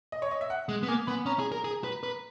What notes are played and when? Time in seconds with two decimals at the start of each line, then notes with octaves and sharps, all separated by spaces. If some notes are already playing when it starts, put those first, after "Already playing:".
0.12 D#5
0.22 C#5
0.31 D#5
0.41 E5
0.50 F#5
0.69 G#3
0.83 B3
0.88 A#3 G#5
1.07 B3 B5
1.26 C#4 A#5
1.39 G#4
1.52 A#4
1.64 G#4
1.84 B4
2.03 B4